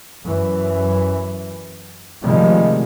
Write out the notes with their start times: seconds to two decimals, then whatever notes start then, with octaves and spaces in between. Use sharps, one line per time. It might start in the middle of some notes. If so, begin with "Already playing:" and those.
0.24 F#2 E3
2.23 A2 C3 D#3 F3 G3 G#3